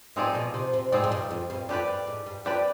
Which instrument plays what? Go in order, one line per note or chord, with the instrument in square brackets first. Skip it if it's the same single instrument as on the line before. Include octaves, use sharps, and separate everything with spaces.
[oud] G#2 [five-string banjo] F3 C4 D#4 G#4 D5
[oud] B2
C3
C3
[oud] G#2 [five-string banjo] F3 C4 D#4 G#4 D5
[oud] G#2
G2
F2
G2
[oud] F2 [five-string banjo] D4 G4 B4 D5
[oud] G2
G#2
G2
[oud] F2 [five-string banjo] D4 G4 B4 D5